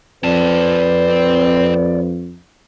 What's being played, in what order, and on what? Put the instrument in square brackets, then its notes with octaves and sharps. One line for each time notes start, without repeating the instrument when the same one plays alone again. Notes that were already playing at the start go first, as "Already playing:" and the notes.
[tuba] F2 [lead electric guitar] C4 A5 [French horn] B4 [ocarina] D5